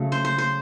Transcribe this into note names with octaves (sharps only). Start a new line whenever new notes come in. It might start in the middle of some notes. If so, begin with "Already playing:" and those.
Already playing: C#3 F#3 A3
C5
C5
C5